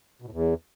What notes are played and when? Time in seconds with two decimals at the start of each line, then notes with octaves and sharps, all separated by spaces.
0.22 B2
0.27 A2
0.32 E2